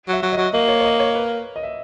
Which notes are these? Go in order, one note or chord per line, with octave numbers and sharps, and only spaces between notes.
F#3 E5
F#3
D#5
F#3
A#3 D#5
C#5
C#5
D#5
C#5
B4
D#5
E5